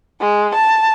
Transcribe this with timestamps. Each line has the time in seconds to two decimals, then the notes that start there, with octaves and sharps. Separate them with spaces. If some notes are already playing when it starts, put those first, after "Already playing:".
0.20 G#3
0.54 A5